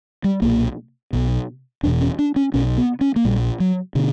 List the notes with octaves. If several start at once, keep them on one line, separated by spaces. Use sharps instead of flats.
G3
B1 A#2 A#3
B1 B2
E1 E2 B2 D4
C#4
D4
C#4
B1 B2 C#4
B3
C#4
A#3
A#1 A#2 G3
F#3
B2 D3